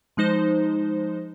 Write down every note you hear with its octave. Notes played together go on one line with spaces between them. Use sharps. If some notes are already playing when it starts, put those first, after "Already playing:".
F3 G#3 D#4 C5